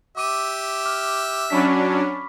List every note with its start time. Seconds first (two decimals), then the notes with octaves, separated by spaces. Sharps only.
0.17 G4 E5 D6 D#7
0.85 D6 F6
1.50 F#3 C#4 D4 B5 C#6 B6